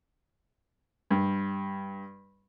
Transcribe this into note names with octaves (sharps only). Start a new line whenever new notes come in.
G2